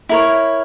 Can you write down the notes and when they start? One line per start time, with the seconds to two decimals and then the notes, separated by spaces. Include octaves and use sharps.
0.09 E4 A#4 C#5